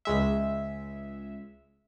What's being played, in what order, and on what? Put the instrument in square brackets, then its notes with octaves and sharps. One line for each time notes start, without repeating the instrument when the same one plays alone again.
[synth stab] C#2 G#3 E5